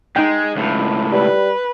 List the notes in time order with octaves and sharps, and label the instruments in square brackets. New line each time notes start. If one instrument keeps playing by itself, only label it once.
[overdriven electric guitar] G#3 [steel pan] D#4 G5
[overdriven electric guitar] C#2 A2
[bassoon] G3 [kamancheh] B4